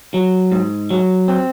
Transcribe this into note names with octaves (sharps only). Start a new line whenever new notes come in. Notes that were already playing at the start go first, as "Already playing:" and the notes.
F#3
G#2
F#3
C4